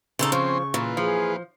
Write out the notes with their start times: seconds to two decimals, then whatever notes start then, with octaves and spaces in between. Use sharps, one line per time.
0.19 C#3 D#4 A4 C5
0.32 F3 C4 C#4 C6 C#6
0.74 A#2 E3 F4 B4
0.97 F3 G#4